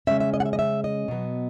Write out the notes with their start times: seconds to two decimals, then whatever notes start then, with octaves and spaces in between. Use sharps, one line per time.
0.07 C#3 G#3 C#4 E5
0.20 E5
0.34 D#5
0.40 F#5
0.46 E5
0.53 D#5
0.59 E5
0.84 D#5
1.08 B2 F#3 B3